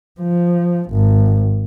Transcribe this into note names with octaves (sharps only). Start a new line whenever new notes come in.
F3
G#1